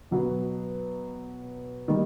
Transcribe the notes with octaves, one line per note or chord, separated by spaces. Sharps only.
B2 F#3 B3
D#3 G3